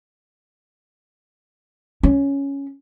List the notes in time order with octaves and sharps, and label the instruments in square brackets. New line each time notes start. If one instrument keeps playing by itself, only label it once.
[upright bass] C#4